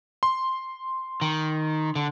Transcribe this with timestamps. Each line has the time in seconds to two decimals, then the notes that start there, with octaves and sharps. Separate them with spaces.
0.23 C6
1.21 D#3
1.95 D3